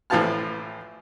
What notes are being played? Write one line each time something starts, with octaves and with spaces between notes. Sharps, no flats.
A1 A2 F3 F5 A5 F6